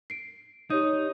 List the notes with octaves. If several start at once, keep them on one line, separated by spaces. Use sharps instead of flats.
C7 D7
D#4 G4 C#5 D#6